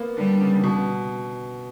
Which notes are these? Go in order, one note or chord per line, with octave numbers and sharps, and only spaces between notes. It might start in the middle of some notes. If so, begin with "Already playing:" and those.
Already playing: A#3 B3
D3 G3
C#3
C#3
B2